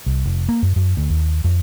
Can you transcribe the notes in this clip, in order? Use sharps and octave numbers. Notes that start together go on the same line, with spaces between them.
C2
F1
A#3
F#2
F#2
D2
D#2
F2